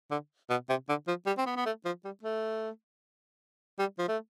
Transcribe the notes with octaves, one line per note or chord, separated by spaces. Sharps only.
D3
B2
C3
D3
F3
G3
C4
B3
B3
A3
F3
G3
A3
G3
F3
A3